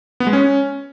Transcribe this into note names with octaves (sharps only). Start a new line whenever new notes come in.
B3
G#3
C#4